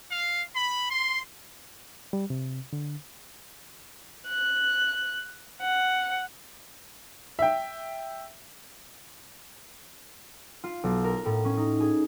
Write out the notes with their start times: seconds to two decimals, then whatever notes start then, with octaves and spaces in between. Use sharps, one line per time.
0.10 F5
0.54 B5
0.90 C6
2.13 G3
2.30 C3
2.73 D3
4.29 F#6
5.61 F#5
7.39 E5 G5
10.64 F4
10.84 B1
11.04 A#4
11.26 A2
11.45 C#4
11.57 D#4
11.80 G#4